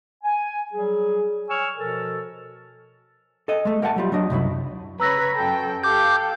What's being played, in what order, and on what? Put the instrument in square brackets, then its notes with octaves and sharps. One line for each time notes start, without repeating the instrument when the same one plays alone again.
[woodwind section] G#5
F#3 G3 G#4
C#5 G#5 C#6 E6 F6
B2 F3 A4 A#4
[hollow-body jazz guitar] A4 D#5
G#3 A3
A3 A#4 F#5 G5 A5
F#3 G3 F4
F#3 D4 D#5
C2 F#2 F#3 E4
[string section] C#3 C#5 B5 [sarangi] B4 [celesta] A#5 E6 A#6
[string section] F#2 G5 [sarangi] A4
[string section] G4 F5 G5 [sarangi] A4 [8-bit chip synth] D6 G6